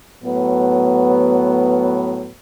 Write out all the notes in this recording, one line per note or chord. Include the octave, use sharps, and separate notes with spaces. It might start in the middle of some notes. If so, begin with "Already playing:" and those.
A2 F#3 B3